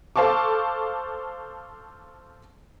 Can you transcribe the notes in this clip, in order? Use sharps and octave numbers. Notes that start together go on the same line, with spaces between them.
A4 C5 F5 A5 C#6 D6